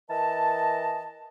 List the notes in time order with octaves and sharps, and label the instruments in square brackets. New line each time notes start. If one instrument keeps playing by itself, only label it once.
[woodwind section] E3 A#4 D#5 A5